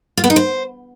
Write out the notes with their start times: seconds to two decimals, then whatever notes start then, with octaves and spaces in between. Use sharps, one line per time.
0.17 F4
0.24 B3
0.30 D#4
0.36 C5